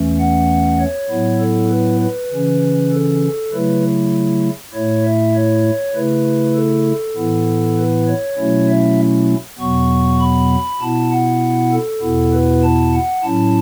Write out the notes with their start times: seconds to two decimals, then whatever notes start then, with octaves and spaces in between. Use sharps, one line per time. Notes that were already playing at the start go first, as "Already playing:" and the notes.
Already playing: E2 E3 A3 C#4
0.19 F#5
0.79 C#5
1.10 A2 F#3 B3 E4
1.39 A4
1.70 B4
2.01 B4
2.31 C#3 E3 C#4
2.92 A4
3.52 C#3 F#3 A3 E4 B4
4.74 A2 A3 E4 C#5
5.05 E5
5.35 C#5
5.95 C#3 A3 E4 B4
6.55 A4
7.16 A2 E3 B3 E4
7.78 B4
8.08 C#5
8.38 B2 F#3 A3 C#4 E4
8.69 E5
9.59 E2 B2 F#3 B3 C#6
10.20 B5
10.81 B2 B3 E4 A5
11.11 F#5
11.72 A4
12.02 E2 B2 B3 E4
12.33 B4
12.63 A5
12.94 F#5
13.23 A2 F#3 C#4 E4 A5